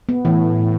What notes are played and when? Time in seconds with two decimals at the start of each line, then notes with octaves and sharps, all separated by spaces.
0.09 B3
0.25 A2 E3